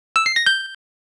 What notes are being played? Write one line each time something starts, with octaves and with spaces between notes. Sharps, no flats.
E6
C7
A#6
G6